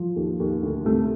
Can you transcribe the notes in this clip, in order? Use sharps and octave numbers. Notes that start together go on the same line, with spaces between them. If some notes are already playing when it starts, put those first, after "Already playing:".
Already playing: F3
D#2
D#2
D2
C3 A3